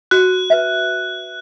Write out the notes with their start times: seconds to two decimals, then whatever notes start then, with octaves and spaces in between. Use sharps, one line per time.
0.11 F#4 F#6
0.50 B4 E5